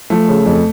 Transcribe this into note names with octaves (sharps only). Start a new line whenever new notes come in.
F3 A3
C#3
F2